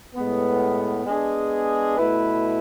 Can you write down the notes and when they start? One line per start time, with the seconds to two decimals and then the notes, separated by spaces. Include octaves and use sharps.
0.14 A2 G#3 B3
1.06 G#3 B3 D4 G#4
1.97 B2 A3 E4 B4